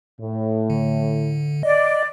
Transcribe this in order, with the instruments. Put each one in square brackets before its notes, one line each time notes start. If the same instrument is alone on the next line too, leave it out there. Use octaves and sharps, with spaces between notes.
[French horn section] A2
[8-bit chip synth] D3
[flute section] D5 [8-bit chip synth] D#5